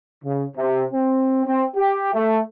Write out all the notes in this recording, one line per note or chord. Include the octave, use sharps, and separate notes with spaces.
C#3
C3
C4
C4
G4
A3